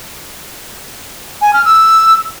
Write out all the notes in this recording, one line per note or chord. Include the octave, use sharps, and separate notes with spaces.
G#5
F6
E6